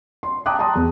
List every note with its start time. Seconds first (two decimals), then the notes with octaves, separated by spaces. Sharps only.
0.23 C6
0.46 G5 A5 A#5 D6 D#6 F#6
0.59 A5 A#5 C6 D#6
0.75 E2